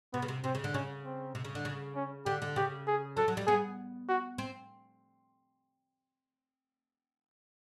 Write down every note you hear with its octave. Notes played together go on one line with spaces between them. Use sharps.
C3 B3
C#3
C3
C3 C4
C#3
D3
C#3 C#4
C4
C3
C#3
D3
C#3
C#4
D3 G4
D3
C#3 G4
G#4
F#3 A4
F#3
G3
B3 G#4
F#4
C4